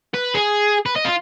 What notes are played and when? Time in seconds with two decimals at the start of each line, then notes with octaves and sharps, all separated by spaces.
0.14 B4
0.34 G#4
0.86 B4
0.96 D#5
1.05 F4